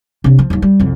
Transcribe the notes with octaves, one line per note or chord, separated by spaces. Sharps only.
C3 D4
F3
D#2 F#3
G3
C2 F2